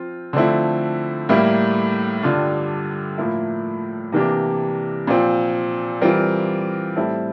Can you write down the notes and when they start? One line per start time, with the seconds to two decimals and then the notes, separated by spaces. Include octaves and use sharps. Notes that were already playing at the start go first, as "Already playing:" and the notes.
Already playing: F3 C4 F4
0.33 D3 F3 A3 C4 E4
1.29 A2 G3 A#3 E4
2.23 G2 D3 G3 D4 F4
3.18 A2 F3 A#3 E4
4.12 C3 E3 A#3 D4 G4
5.07 A#2 F3 C4
6.01 E3 G3 C4 F4 A#4
6.96 A2 G3 C4 E4 A4